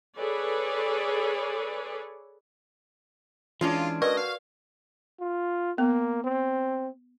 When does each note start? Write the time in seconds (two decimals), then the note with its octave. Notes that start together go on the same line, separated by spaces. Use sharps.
0.17 G#4 A4 B4 C#5 D5
3.61 E3 G#3 C#4 D4 F4
4.02 F#4 A#4 B4 D5 D#5
4.17 F5
5.20 F4
5.78 A#3 B3
6.24 C4